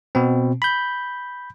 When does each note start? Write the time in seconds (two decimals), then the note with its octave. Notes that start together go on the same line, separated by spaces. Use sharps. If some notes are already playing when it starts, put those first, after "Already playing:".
0.15 B2 C4
0.62 B5 G6